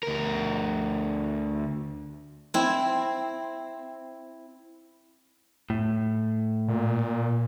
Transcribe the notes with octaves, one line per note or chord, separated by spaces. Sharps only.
D2 A#4
C4 E4
A2
A#2